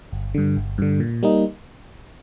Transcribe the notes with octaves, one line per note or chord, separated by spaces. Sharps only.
G1
G2 D3
G1
G2 D3
A#2
G3 A#3 D#4